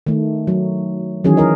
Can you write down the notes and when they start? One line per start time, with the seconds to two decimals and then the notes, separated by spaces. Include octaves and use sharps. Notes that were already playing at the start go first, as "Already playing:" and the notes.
0.07 D#3 A3
0.47 F#3
1.24 D#3 E3 F#3 C#4 G#4
1.37 D#4 A#4 D#5